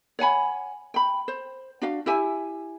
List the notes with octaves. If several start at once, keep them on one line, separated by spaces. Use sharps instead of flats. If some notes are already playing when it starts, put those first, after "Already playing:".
C#5 F#5 G#5 B5
G5 B5
C5
D4 F#4 F5
E4 G4 E5 G#5